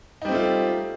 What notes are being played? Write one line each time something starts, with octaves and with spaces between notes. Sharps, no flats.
G3 A3 C4 D#4 F4